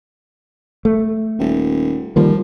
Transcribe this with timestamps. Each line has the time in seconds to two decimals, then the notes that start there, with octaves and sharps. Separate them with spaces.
0.85 A3
1.39 D#1
2.16 D#3 F3 G3 A#3